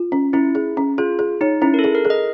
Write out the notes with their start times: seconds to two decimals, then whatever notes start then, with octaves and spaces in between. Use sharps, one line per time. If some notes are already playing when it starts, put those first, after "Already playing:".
Already playing: F4
0.12 C#4
0.33 C#4 E4
0.55 G#4
0.77 C#4
0.98 F4 G#4
1.19 G#4
1.41 D#4 C#5
1.62 C#4 E4
1.74 A#4
1.79 A4
1.84 G#4
1.95 A#4
2.05 G#4
2.10 D#5